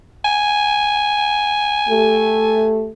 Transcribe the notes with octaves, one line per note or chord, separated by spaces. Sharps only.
G#5
A3 G4 A4